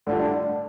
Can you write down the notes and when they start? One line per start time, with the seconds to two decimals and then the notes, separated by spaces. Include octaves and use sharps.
0.07 A2 D3 G3 D4 F4
0.20 D3